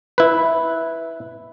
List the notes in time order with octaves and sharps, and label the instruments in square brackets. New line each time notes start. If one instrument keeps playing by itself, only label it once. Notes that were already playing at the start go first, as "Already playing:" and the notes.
[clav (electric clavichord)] E4 B4